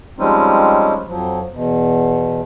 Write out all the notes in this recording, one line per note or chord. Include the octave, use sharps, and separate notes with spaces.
F3 G3 G#3 C4 C#4 D#4
F2 F3 F#3
E2 B2